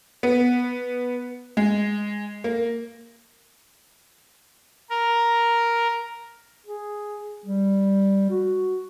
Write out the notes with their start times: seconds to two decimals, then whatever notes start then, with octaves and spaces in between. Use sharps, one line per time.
0.23 B3
1.57 G#3
2.44 A#3
4.90 A#4
6.66 G#4
7.45 G3
8.30 F#4